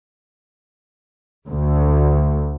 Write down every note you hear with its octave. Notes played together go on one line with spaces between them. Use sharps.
D2